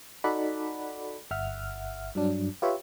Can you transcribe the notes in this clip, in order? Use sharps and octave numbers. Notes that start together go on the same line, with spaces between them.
D#4 F#4 A4 D5 F#5 B5
G1 E5 F#5 F6
G2 F#3 D4
F4 G4 B4 C#5 E5